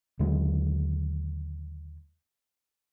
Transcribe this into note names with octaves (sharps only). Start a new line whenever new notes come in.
D#2 D3 F#3 G#3